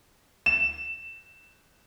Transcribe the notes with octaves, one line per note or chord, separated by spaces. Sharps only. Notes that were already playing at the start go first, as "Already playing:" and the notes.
E7